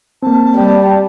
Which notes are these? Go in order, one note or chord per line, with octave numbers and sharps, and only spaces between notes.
A#3 C4 A5
G3